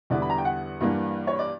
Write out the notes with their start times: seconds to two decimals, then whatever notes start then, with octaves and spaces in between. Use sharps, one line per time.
0.10 E2 D3 G3 B3 E4 D5
0.22 B5
0.30 A#5
0.38 G5
0.45 F#5
0.81 G2 E3 A#3 D4
1.27 C#5
1.39 D5